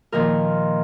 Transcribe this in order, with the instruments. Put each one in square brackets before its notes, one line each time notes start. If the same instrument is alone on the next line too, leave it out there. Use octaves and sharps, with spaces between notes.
[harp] A#2 D#3 F3 A#4